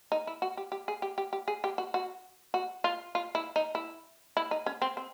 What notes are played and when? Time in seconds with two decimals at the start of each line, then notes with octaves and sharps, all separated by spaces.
0.12 D#4
0.27 E4
0.42 F#4
0.57 G4
0.72 G4
0.88 G#4
1.02 G4
1.18 G4
1.33 G4
1.48 G#4
1.64 G4
1.78 F#4
1.94 F#4
2.54 F#4
2.84 F4
3.15 F4
3.35 E4
3.56 D#4
3.75 E4
4.37 E4
4.51 D#4
4.66 C#4
4.82 C4
4.97 C4